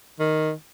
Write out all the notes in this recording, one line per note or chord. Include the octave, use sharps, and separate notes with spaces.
D#3